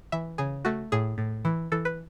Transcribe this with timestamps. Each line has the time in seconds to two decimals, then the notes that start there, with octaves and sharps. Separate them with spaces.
0.12 E3 E5
0.38 C#3 G#4
0.65 A3 F#4
0.92 A2 G#4
1.18 A2
1.45 E3
1.72 E3 A4
1.85 B4